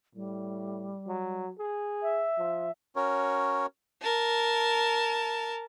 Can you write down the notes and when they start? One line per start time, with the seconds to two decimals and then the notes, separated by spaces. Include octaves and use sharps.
0.15 A2 G3
1.07 F#3
1.59 G#4
2.03 E5
2.38 F3
2.96 C#4 F#4 A#4 C#5
4.02 A#4 A5